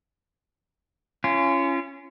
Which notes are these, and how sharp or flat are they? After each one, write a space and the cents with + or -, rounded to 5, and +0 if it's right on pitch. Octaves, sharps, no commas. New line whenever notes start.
C#4 +5 F4 -40